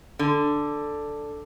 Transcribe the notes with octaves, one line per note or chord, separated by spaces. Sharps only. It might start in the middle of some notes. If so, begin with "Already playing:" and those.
D3